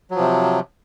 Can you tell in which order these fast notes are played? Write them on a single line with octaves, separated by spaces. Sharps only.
F#3 F3 C3